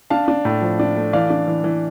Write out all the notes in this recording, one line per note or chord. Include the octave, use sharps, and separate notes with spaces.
D4 F5 A5
D4
A2
F3
D4
A3
E3 D5 F5
D4
E3
E3